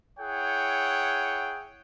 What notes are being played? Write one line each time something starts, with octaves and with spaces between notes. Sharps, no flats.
E4 G#4 C#5 F#5 G5